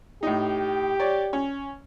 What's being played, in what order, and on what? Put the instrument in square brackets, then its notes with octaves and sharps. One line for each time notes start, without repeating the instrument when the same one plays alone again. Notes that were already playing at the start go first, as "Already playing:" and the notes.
[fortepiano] A2 D#4 [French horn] G4
[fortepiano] C#5 D5
C#4